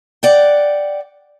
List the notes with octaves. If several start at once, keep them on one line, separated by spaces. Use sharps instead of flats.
D5 F#5 G5